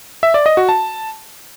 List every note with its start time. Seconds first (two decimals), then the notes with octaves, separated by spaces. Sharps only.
0.23 E5
0.34 D5
0.46 D#5
0.57 F#4
0.69 A5